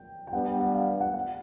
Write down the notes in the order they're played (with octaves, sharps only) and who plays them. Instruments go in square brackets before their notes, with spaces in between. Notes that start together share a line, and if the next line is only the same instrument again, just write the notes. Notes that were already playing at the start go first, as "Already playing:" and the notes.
Already playing: [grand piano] G5
G5
[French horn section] G3 B3 D4 [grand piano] F#5
[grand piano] G5
F#5
F5
F#5
F#5